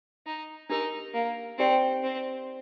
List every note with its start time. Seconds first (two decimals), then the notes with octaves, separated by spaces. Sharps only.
0.26 D#4
0.69 D4 D#4 G4 A#4
1.14 A#3
1.58 C4 D#4 G4 D5 G5
2.03 C4